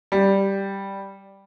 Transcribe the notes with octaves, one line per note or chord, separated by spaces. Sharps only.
G3